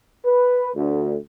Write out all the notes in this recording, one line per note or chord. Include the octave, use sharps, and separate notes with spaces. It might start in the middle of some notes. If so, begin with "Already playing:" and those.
B4
D2